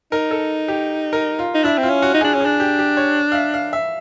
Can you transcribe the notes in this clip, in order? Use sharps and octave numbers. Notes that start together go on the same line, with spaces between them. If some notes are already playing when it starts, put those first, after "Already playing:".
D#4 A#4
A4
G4
A#4
F4
D#4
D4 E4
C4
F4
C#4
F#4
D#4
D4 G#4
C#4
D4 G#4
G4
G4
C#5
F5
E5
F5
E5